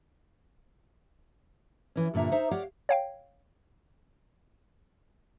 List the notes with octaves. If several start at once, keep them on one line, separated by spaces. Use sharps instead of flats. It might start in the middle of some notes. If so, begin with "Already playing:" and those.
E3 C#4
G2 A#2 D3 E5 A#5
D#4 C5 E5 A#5
G4 C#5 D5 F5 F#5
C#5 F5 G5